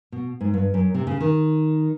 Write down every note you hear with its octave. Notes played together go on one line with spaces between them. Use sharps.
B2
G#2
G2
F#2
C3
C#3
D#3